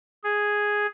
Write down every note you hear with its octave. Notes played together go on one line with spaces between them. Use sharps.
G#4